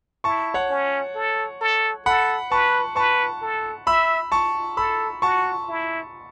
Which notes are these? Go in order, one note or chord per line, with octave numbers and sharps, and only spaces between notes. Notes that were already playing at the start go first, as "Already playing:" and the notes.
E4 A5 C#6
C#5 F#5
C#4
A4
A4
A4 F#5 B5
B4 A5 C#6
B4 A5 C#6
A4
E5 B5 E6
A5 C#6
A4 B5 E6
F#4 A5 C#6
E4